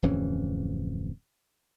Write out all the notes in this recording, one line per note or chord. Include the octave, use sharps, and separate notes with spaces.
D1 F2 E3 C#4